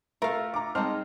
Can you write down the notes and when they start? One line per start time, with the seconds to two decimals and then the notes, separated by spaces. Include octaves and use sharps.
0.22 A3 F4 F#4 A#4 E5 F5
0.54 A#5 D6
0.75 G#3 C4 D#4 D#5 A5 F6